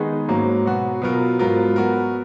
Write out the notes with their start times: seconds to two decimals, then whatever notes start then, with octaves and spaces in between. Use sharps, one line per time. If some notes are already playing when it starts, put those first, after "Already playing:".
Already playing: D#3 G#3 B3 D#4 G#4
0.28 G#2 F#3 A#3 C#4
0.65 B2 F#3 B3 F#4
1.02 B2 F#3 B3 F4 A#4
1.39 G#2 F#3 B3 F4 A#4
1.76 F#3 B3 F#4 A#4